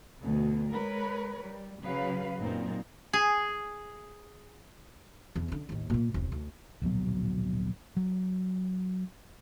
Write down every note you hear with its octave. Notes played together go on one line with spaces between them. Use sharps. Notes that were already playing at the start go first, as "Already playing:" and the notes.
D2 B2
G#3 A#4 B4 C#5
G3
C#3 F#3 B4 F5
F#2 A#2 A#3 C4 D#4
G#4
E2
D3 C#4
A1 D#2
A#2 A#3
E1 C2
D2
D1 A#1 B2 F#3
F#3